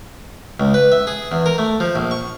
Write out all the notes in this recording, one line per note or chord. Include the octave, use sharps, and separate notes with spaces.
C#2
B4
E5
G#4
E2
A#4
A3
F3
A#1
C#6